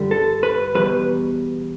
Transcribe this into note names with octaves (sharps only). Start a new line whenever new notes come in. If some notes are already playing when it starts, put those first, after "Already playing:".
Already playing: G2 D3 G3
A4
B4
E2 B2 G3 B4